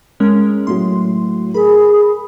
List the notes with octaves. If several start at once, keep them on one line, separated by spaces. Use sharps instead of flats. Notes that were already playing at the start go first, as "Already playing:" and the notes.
G#3 C#4 A#4
A2 F#3 C6
G#4 A#4 B5